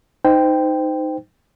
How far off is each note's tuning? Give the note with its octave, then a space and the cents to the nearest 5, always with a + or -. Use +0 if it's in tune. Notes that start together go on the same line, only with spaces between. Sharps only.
D#4 +0 C5 -30 G5 +0